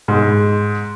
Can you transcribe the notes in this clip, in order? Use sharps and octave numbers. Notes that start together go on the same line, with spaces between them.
G#2